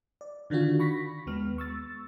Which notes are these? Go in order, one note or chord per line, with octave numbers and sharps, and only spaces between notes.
D5
D3 D#3 D4 F4 F#4
B5 C#6 A#6 B6
D#2 G#3 B3 F6
C#6 E6 A6